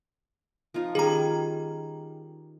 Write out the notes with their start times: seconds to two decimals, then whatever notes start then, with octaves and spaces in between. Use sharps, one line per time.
0.74 F3 D#4 F4
0.95 D#3 G3 C#4 G#4 A#5